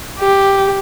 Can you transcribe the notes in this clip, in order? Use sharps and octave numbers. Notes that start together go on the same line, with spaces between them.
G4